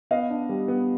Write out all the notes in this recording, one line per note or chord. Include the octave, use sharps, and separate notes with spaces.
B3 D#5 F5
D4
G3
B3